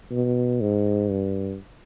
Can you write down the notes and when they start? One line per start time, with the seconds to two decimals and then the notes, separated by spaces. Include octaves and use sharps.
0.11 B2
0.61 G#2
1.10 G2